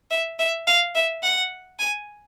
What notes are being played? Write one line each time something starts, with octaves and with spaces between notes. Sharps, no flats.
E5
E5
F5
E5
F#5
G#5